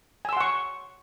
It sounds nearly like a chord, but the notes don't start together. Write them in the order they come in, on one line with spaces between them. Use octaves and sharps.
G#5 E6 C6 F#5 C#6